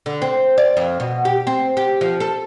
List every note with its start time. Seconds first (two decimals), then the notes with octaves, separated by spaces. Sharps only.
0.06 D3
0.22 C4
0.58 D5
0.77 F2
1.00 B2
1.25 G4
1.47 C4
1.77 G4
2.01 F3
2.20 A4